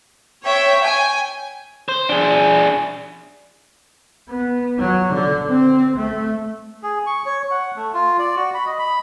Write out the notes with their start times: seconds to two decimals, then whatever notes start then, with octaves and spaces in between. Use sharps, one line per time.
0.43 C#5 E5 G5
0.82 G5 G#5
1.89 C5
2.09 D4 G#4
4.29 B3
4.79 F#3
5.14 D3
5.49 C4
5.97 A3
6.83 G#4
7.06 C#6
7.26 C#5
7.51 F#5
7.76 A3
7.94 F4
8.19 D5
8.36 F#4
8.54 B5
8.66 D#5
8.79 B5